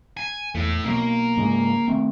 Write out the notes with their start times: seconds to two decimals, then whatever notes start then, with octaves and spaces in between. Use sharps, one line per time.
0.17 G#5
0.55 E2 A3 E4
0.85 B2 F#3 A#3
1.37 G#2 C#3 G#3
1.88 D#3 A3 C4